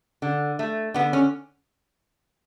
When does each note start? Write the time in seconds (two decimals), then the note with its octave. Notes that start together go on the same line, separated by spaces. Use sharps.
0.22 D3
0.59 A3
0.94 D3 B3
1.13 C#4